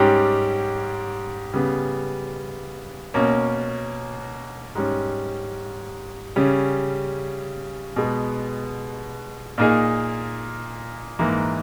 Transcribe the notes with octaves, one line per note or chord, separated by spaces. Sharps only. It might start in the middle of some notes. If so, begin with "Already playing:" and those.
Already playing: G#2 G3 C#4 G4
C#3 G3 B3
B2 A#3 C#4
G#2 G3 C#4
C#3 G3 C#4
B2 G#3 B3
A#2 A#3 D#4 G#4
G#2 E3 A#3